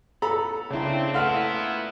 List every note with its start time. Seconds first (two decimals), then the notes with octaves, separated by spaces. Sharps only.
0.22 B3 A4 A#5 B5
0.70 C#3 C4 D4 E4
1.14 A#2 A3 B3 E4 F5 F#5 C6 F6